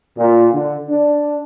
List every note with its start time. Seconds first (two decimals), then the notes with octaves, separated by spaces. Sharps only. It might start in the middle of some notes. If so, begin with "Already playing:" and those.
0.17 A#2
0.53 D3
0.89 D4